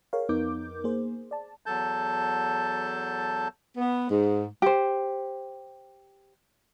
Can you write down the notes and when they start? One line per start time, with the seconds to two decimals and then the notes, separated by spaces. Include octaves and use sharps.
0.13 G#4 A#4 C#5 F5
0.29 F2 B3 D#4 A#4 D6 G6
0.84 A#3 G#4 C5
1.31 D5 A5
1.66 E2 F#3 A4 A5 G6
3.77 B3
4.10 G#2
4.62 G4 C5